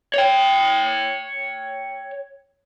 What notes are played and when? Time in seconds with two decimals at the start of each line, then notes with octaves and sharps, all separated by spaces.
0.14 C#5 G5